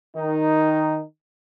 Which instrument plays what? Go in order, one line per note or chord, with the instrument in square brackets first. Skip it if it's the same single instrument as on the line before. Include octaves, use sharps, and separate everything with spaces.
[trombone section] D#3 D#4